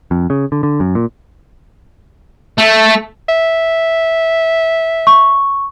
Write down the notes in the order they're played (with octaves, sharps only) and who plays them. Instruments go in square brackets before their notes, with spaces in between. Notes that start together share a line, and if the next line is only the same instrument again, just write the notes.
[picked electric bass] F2
C#3
D3
D3
F#2
A#2
[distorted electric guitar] A3
[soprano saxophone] E5
[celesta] C#6